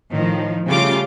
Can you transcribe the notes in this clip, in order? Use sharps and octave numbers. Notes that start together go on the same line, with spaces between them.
A2 D#3 F3
C#3 G3 A3 F4 D6